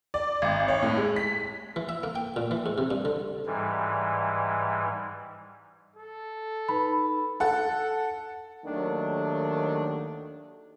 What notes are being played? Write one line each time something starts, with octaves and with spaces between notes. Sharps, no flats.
D5
G#1
C#5
A2
G#3
B6
E3
E5
A#3
G5
A#2
E3
G#2
C3
G2
D3
G#2 E3 G3
A4
D#4 B4 B5
A4 F#5
D#2 D#3 F#3 A3 D4